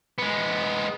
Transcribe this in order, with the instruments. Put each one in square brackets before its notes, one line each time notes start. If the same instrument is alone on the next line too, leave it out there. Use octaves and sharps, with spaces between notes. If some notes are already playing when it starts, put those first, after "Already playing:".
[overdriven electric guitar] G#3 B3